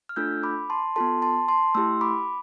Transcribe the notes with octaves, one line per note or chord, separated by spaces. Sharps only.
F6
A3 D4 F4 A4 E6 G6
B5 D6
A5 C6
B3 F4 A4 A5 C6
A5 C6
A5 C6
A3 E4 G4 C6 E6
B5 D6